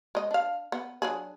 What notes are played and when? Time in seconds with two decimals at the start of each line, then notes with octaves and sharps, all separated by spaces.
0.15 G#3 D#5
0.31 D4 F5
0.72 B3
1.02 F#3 D4 G#4